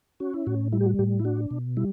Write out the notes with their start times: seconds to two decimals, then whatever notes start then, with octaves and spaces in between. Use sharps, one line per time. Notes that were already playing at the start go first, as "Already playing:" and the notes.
0.20 C#4 F#4
0.34 E4
0.47 A2 F#4
0.72 G3 E4
0.80 G4
0.86 F#4
0.99 A2 G4
1.19 E4
1.25 D4 F#4
1.51 B2
1.77 G3 E4